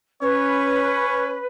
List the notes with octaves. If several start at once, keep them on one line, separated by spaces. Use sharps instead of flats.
C#4 B4 C#5